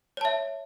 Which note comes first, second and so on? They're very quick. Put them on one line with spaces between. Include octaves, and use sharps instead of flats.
C#5 A5 E5